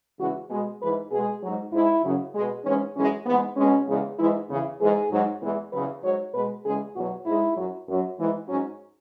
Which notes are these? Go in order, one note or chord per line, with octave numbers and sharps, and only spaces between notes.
E2 C#3 E3 G#3 F#4
B2 G#3 G#4
G#2 E3 G#3 B4
B2 G#3 G#4
G#2 F#3
G#2 G#3 E4
F#2 C#3 F#3
B2 G#3
G#2 E3 G#3 C#4
F#2 E3 G#3 C#4
G#2 E3 G#3 B3
B2 G#3 C#4
E2 C#3 G#3
G#2 E3 G#3 E4
E2 C#3 E3
G#2 E3 G#3 G#4
G#2 F#3
E2 E3 G#3
E2 C#3 F#3 B4
G#2 F#3 C#5
B2 G#3 B4
E2 C#3 G#3 G#4
E2 B2 F#3 F#4
G#2 G#3 E4
F#2 F#3
F#2 F#3
G#2 E3 G#3
G#2 F#3 C#4